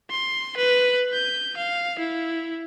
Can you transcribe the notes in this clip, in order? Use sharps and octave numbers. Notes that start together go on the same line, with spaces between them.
C6
B4
G6
F5
E4